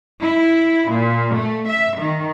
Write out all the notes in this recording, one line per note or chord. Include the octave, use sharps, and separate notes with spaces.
E4
A#2
A3
E5
D#3